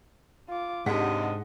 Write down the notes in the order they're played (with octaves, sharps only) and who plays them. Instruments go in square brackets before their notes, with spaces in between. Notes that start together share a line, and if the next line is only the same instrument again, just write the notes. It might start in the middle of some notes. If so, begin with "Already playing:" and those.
[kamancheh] F4 D6
[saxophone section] D#2 C3 [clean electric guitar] G#2 [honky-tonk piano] G#3 F#5 B6 [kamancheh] D4 D#5